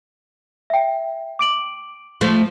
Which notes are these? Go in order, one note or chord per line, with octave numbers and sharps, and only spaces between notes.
E5 G5
D6 D7 F#7
F3 A3